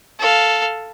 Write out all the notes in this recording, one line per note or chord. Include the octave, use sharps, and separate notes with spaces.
A4 F5